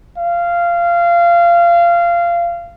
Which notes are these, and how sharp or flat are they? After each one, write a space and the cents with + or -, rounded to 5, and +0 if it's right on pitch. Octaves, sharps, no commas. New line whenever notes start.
F5 -20